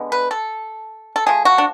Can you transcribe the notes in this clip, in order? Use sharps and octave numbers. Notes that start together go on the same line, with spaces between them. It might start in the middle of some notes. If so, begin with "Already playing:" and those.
Already playing: D3 G#3 B3
B4
A4
A4
F3 A3 G#4
F#4
D4